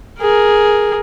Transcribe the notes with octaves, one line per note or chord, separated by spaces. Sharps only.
G#4 A#4